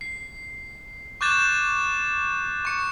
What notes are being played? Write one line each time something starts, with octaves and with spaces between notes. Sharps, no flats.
C7
C#6 D6 F#6 G6 A6 E7
C#6 C#7